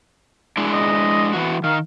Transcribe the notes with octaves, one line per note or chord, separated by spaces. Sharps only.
G#3 D4 E4
D#5
E3 F#4
D#3 F5